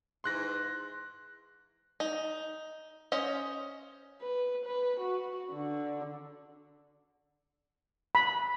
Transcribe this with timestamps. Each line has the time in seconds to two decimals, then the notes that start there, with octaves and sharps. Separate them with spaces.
0.24 G#2 E3 C6 F#6 A#6
2.00 D#4
3.12 C#4 C5 D#5
4.21 B4
4.65 B4
5.00 F#4
5.52 D3
8.15 B5